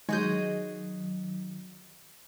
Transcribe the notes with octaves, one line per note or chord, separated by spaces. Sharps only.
D#3 F#3 G#3 F#4 G#4 D#5 G6